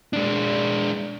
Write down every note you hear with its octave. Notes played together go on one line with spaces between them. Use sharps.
G#3 D4